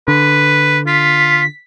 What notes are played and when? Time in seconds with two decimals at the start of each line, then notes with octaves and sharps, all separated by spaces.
0.08 D3 B4
0.87 F4 B6